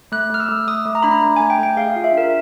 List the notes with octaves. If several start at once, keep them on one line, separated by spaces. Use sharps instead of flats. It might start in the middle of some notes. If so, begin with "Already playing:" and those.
A3 F#6
A3 F6
E6
A3
A3 D#6
A3
A#5
D4 B5
A#5
A3
A3 G#5
G5
A3
G5
G#4 F5
F5
F4
E5
D4 A#4